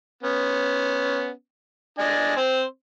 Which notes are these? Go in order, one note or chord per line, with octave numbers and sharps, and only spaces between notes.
B3 C#4
D4 D#5 G#5
C4 C5